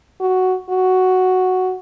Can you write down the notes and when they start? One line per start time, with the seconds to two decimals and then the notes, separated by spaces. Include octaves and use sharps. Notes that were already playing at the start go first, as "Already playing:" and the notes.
0.20 F#4
0.70 F#4